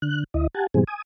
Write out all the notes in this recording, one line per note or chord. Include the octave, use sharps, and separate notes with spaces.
D3 F#6
D2 E4 D#5
G4 F#5 G#5 A5
G#2 B2 E3 G3 C4 G#4
G#5 D#6